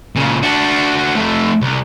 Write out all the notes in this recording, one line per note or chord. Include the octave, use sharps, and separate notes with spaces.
A#2 C#3
D4 F#4
F2 A3
C2